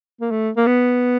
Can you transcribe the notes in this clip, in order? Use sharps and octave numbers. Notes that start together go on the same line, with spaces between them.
A#3
A3
A#3
B3